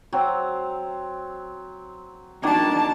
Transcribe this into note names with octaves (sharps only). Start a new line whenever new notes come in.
F#3 C4
D#3 A#3 D4 F#4 A5